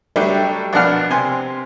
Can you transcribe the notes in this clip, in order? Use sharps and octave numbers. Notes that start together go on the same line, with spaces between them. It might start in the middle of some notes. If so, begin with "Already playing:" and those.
F#3 G3 A3 D4 G4
A#1 B2 D4 F#5 F6
C3 G#5 C6